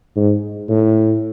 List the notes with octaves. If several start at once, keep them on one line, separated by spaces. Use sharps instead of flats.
G#2
A2